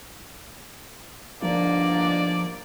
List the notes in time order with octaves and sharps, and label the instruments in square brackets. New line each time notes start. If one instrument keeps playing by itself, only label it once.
[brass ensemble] G1 G#2 D4 [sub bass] F3 [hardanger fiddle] A#3 [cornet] D5